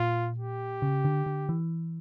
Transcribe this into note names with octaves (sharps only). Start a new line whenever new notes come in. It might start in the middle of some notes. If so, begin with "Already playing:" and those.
Already playing: A#2 F4
G4
C#3
D3
D3
E3